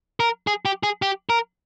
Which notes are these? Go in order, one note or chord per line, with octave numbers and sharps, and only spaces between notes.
A#4
G#4
G4
G#4
G4
A#4